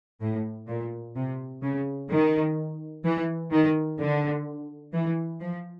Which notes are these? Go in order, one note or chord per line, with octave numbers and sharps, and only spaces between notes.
A2
A#2
C3
C#3
D#3
E3
D#3
D3
E3
F3